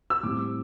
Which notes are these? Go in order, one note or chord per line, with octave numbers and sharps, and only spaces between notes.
E6
A2 G3 C4 D6